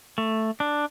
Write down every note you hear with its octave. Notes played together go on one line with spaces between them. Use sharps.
A3
D4